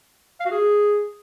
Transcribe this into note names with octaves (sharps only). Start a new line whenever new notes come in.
F5
F#4
G#4